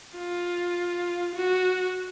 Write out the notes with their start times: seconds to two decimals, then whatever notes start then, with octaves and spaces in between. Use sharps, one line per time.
0.18 F4
1.35 F#4